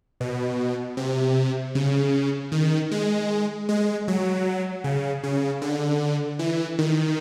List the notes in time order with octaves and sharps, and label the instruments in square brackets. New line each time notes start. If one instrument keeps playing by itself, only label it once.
[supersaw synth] B2
C3
C#3
D#3
G#3
G#3
F#3
C#3
C#3
D3
E3
D#3